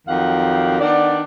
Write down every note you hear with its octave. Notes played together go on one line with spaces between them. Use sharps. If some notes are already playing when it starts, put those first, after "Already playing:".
F2 D#3 F#3 G4 F5 F#5
D#3 B3 D4 D5